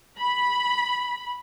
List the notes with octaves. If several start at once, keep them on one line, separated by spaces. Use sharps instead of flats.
B5